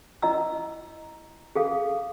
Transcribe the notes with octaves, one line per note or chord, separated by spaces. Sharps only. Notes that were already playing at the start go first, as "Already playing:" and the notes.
E4 D#5 A#5 E6
G#4 A4 F5